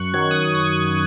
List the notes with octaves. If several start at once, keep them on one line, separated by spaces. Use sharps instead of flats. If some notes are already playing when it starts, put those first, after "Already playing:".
Already playing: F#2 C#6 F#6
D#3 F#3 G#6
F#6
D#6 G#6
D#6 G#6